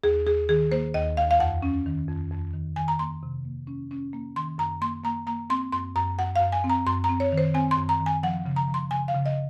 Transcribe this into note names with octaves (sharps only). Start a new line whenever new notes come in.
D#2 G#4
D#2 G#4
D#3 G#4
A#3 C5
D#2 D#5
D#2 F5
F5
F2 F#5
C#4
D#3
F2
F2
D#3
D#3 G#5
A#5
A#3 C6
C3
A#3
C#4
C#4
A#3
D#3 C6
F#2 A#5
A#3 C6
A#3 A#5
A#3 A#5
C4 C6
F#2 C6
F#2 A#5
F#2 F#5
F#2 F5
G#5
C4
A#5
F#2 C6
A#5
C4
C#5
D#3
C5
C4 G#5
C6
F#2
A#5
D#3
G#5
F3 F#5
C#3
A#5
F3
C6
C#3 G#5
F5
C#3
D#5